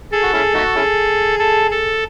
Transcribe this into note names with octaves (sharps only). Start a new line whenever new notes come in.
G#4 A4
F#4
C#4 E4 G#4
A3 D#4 F#4
C#4 E4 G#4
A4
A4